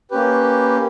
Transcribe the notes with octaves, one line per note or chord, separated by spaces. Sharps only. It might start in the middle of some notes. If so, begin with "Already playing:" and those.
A#3 C#4 G4 B4